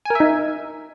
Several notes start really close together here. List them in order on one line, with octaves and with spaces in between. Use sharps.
G#5 A#4 E5 D#4